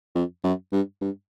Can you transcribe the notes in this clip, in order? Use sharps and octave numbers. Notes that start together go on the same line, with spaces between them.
F2
F#2
G2
G2